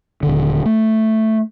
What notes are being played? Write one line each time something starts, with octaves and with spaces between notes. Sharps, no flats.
D#1 D3
A3